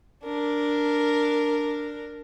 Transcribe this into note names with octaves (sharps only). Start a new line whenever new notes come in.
D4 A#4